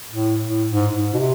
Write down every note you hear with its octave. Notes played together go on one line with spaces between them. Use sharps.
A2
A2
G#2
G#2
B2
C3